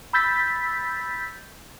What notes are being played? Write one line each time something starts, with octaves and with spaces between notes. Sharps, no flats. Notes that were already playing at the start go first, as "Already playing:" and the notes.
B5 E6 G6 A6 B6